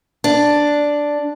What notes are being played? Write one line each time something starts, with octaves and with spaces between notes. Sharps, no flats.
D4